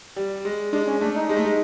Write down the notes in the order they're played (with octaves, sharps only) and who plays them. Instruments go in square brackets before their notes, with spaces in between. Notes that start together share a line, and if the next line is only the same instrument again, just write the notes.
[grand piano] G3
G#3
[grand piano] G#3 [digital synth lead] D4
[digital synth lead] C#4
[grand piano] A3 [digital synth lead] D4
[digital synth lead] D#4
[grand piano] G#3
A3
G#3